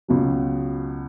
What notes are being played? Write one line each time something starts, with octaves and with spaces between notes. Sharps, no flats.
C#2 B2 F#3